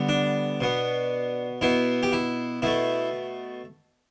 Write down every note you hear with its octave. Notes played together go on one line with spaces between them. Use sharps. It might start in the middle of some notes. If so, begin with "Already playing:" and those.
Already playing: D3 G3 B3
D4
B2 B3
B2 B3 E4
G4
E4
B2 A3 E4